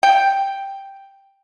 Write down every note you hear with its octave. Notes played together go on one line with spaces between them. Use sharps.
G5